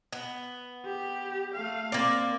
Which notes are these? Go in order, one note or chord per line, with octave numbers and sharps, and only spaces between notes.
B3
G4
A3 F5
A#3 C4 D5